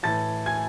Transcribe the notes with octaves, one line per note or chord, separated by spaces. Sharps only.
A2 E3 A5 A6
G#5 G#6